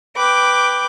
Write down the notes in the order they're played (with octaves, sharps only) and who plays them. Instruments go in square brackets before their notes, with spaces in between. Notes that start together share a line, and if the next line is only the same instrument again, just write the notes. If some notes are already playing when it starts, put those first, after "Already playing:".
[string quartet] B4 G5 D6